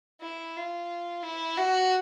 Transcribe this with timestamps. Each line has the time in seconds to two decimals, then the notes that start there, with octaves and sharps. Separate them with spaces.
0.21 E4
0.56 F4
1.23 E4
1.57 F#4